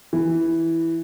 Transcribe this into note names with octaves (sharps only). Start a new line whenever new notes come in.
E3